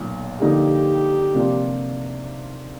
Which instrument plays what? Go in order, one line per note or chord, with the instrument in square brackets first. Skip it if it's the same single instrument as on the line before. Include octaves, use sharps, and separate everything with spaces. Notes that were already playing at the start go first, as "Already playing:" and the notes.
Already playing: [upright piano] B1 A#2
[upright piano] D3 F3 A#3 D#4 F#4 [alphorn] G4
[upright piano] C3 F3 A#3 D4 F4